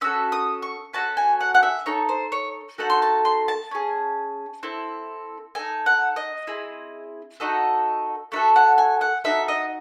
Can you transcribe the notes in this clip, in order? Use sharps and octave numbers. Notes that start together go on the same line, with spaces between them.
C#4 F#4 A4 E6
D#6
C#6
C#4 F#4 A4 A5
G#5
F#5
F#5
E5
D#4 A4 C#5
C5
C#5
A3 D#4 F#4 A4 F#5
C6
A5
C6
A5
C#4 G#4
C4 E4 A4
D#4 A4 G#5
F#5
D#5
C4 E4 G#4
A3 D#4 F#4 A4 D#5
A3 D#4 F#4 A4 E5
F#5
G#5
F#5
D#4 F#4 A4 E5
D#5